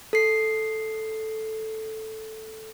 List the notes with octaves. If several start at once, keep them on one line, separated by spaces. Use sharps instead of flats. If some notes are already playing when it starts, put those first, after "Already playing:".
A4 C7